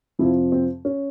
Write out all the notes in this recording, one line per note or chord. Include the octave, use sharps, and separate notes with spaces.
F2 C3 F3 E4
C4
C#4